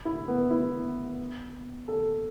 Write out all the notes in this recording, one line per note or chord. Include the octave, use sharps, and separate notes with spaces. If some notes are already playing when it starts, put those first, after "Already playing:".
E4
B3
E4
A4